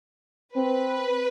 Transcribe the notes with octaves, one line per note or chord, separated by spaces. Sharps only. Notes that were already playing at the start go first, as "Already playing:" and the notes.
C4 B4